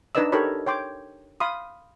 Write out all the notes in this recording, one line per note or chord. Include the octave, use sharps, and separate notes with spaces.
D4 D#4 B4 D5 D#5 E6
D#4 G4 A4 A#4 C#5 B5
C#5 G5 C6 D6
F5 B5 C6 D#6